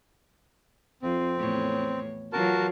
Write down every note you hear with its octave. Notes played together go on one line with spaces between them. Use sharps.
F2 C4
E2 A2 C#5
E3 F#3 F4 F#4 A#4 A5